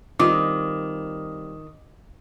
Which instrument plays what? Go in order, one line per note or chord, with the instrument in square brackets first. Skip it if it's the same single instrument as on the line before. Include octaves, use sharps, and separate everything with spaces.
[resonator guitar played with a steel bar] D#3 [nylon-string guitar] G3 C4 F4 [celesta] D6